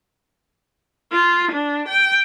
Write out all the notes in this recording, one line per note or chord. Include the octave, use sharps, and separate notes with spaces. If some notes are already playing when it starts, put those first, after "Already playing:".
F4
D4
G5